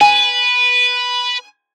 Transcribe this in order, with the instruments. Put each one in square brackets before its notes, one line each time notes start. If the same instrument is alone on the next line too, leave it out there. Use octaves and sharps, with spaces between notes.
[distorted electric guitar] B4 [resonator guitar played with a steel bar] G#5